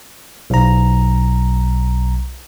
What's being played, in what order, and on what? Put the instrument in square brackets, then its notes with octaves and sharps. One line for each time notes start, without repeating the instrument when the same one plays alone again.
[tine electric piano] B1 A#5